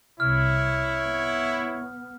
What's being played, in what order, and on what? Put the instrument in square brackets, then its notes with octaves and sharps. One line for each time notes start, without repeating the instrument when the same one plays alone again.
[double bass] C2 C3 [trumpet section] E4 C#5 [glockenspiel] F6
[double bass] B3